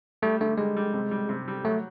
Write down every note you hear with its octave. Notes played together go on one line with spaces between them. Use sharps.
G3 A3
D3 A3
G3 G#3
G3
C3
G3
C3
G3
F#3 A3